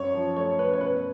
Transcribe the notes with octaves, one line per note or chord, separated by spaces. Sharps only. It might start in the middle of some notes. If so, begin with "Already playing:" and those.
Already playing: F#2 C#5
F3
A3 C#5
F#2 B4
C#5
B2 B4